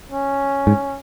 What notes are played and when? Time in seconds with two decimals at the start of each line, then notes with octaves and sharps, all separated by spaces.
0.10 C#4
0.67 G#2